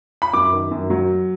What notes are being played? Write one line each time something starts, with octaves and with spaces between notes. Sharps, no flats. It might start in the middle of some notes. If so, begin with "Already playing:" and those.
B5
F#2 D6
D#3
F#2
F#3